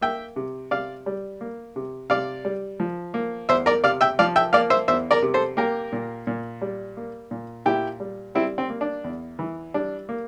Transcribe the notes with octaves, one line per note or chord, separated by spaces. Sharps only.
A#3 E5 G5
C3
C3 D5 F5
G3
A#3
C3
C3 D5 F5
G3
F3
A#3
E2 C5 E5
A#4 D5
C3 D5 F5
E5 G5
F3 D5 F5
E5 G5
A#3 D5 F5
C5 E5
E2 C5 E5
A#4 D5
C3
A4 C5
A#3 G4 A#4
A#2
A#2
G3
A#3
A#2
A#2 E4 G4
G3
G3 C4 E4
C4
A#3
D4
E2
E3
G3 D4
A#3